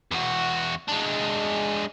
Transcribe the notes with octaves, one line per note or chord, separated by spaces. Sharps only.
E2 F#4
G#3 D4